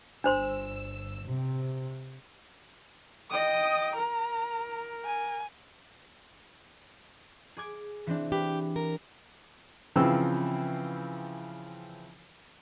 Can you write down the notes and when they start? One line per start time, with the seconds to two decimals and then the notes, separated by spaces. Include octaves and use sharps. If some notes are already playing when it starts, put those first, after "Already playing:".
0.24 G1 D4 C5 C6 E6
1.25 C3
3.31 D#5 G5 D#6
3.96 A#4 A#5
5.05 G#5
7.57 G#4 D6 G#6
8.07 E3 C4 D4
8.32 G4 B4
8.76 A#4
9.96 C#3 E3 F3 C4 G5 E6